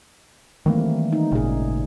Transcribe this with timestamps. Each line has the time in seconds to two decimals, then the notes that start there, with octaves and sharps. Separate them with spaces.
0.66 D#3 E3 G3 A3 A#3 C4
1.13 D#4
1.32 G#1 A#2 C#3 G#4